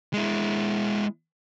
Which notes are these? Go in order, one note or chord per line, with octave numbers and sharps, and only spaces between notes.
G#3 E4